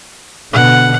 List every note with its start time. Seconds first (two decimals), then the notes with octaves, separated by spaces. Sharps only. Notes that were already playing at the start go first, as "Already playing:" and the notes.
0.53 B2 D3 F#5